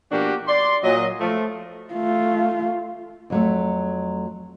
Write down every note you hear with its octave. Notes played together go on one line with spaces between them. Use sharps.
B2 F3 A#3 D4 F#4 G4
D5 C6
A#2 F#3 D#5
F3 A3
A3 F4
F2 F#3 A3